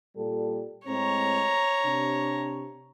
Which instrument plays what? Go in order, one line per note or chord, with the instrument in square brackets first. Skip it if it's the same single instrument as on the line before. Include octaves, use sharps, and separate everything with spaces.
[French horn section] A#2 G3 A4
[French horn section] A2 G#3 C4 [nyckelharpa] C#5 A#5
[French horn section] C3 D4